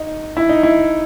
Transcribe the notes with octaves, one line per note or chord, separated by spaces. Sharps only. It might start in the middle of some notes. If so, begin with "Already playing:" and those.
Already playing: D#4
E4
D#4
E4